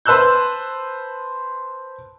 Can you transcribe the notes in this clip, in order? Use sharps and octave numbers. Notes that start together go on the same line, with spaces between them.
B4 C5 A5 E6 F#6 G6